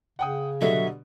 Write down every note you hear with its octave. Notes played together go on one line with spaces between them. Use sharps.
C#3 F#5 G5 D#6
B2 D3 F#3 G3 A4 D#5 E5